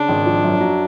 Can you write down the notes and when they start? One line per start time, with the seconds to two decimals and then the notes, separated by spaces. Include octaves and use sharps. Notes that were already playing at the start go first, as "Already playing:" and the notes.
Already playing: C#3 D4
0.09 G#1
0.26 F3
0.44 F#2
0.60 F#3